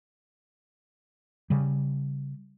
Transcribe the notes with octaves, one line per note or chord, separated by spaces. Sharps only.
C#3 G3